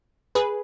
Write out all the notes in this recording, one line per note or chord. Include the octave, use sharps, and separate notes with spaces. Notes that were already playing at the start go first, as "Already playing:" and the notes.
G#4 B4